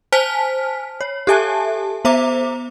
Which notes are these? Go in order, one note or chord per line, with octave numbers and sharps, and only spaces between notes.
C5 G#5 A5 F6 B6
C#5
G4 A4 E5 G#5 A5
B3 C5 E5 A#5 D6